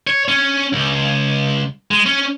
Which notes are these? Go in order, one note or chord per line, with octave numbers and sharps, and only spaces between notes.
C#5
C#4
C#2
G#3
C#4